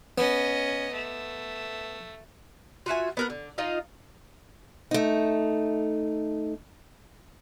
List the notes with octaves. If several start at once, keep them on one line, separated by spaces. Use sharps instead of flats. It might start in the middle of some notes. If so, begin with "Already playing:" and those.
B3 C#4 D#5
A3
F4 F#4 E5 G#5
B3 A#4 F#5
D3
D#4 F4 D#5 F5
A3 D#4